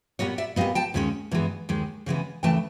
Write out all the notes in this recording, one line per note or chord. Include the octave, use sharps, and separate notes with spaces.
A#2 G3 B3 C#5 D#5
D5 E5
A#2 G3 B3 D#5 F5
G5 A5
D#2 D#3 G#3 C#4
G2 E3 G#3 B3
D#2 D#3 G#3
C#3 E3 G#3 B3
D#2 C#3 E3 A3 G5 A5